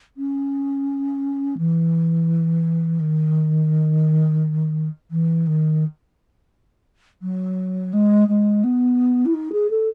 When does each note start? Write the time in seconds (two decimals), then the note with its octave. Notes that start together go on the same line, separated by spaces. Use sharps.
0.17 C#4
1.58 E3
3.00 D#3
5.10 E3
5.47 D#3
7.22 F#3
7.93 G#3
8.28 G#3
8.63 B3
9.25 E4
9.33 D#4
9.52 G#4
9.70 A4